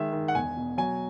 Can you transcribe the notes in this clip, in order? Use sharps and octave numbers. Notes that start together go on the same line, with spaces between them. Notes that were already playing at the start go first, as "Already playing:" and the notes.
Already playing: D#3 G#3 E5
D#3
F#5
E1 G#5
B2
F#3 G#5